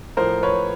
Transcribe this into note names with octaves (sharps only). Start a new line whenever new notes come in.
A2 F3 A#4 C5
B4 C#5